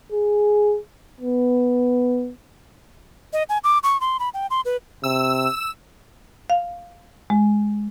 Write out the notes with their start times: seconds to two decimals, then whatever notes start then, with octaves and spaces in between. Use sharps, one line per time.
0.12 G#4
1.20 B3
3.33 D#5
3.49 G#5
3.64 D6
3.83 C#6
4.01 C6
4.19 B5
4.34 G5
4.51 C6
4.65 B4
5.04 C3 E6
6.50 F5
7.30 G#3